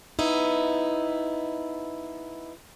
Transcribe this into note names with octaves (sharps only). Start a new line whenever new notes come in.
B3 D#4 E4